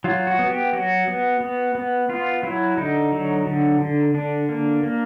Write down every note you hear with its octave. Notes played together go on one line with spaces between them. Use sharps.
F#3 F4
F#4
B3
G4
F#3 F#4
B3
B3
B3
B3 F4
F#3 E4
D3 D#4
F#3
D3
D3
D3 D4
A#3
A#3